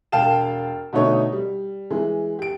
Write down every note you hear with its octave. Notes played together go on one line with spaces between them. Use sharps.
E1 F5 G5 A5 E7
B2 D3 A3 D#4 C#5
G3
E3 G#3
G4 D7